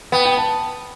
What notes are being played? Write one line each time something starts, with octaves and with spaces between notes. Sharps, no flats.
B3 G5
G5
A5